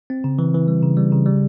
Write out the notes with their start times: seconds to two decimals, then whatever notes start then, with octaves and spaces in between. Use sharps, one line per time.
0.10 C4
0.24 C#3
0.39 E3
0.54 E3
0.68 G3
0.82 C#3
0.97 G3
1.12 C#3
1.26 G3